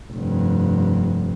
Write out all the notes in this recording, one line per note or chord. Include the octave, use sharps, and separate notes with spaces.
F1 G2